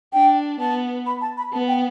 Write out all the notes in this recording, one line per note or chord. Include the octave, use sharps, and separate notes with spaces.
D4 G5
B3 A5
B5
A5
B5
B3 A5
G5